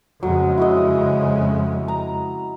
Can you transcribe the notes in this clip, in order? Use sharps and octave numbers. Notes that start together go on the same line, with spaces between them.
F2 C#3 F#3 G#3
E4 F#4 D#5
A#5